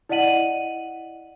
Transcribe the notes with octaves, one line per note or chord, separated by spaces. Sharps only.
E4 D5 D#5 F#5 D#7 F#7